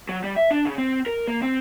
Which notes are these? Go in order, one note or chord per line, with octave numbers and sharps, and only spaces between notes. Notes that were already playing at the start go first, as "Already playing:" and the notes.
F#3
G3
E5
D4
C#3
C4
A#4
A#3
C4